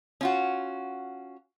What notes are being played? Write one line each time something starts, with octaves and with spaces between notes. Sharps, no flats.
C#4 F4 F#4